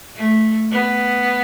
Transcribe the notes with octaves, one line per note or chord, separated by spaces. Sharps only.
A3
B3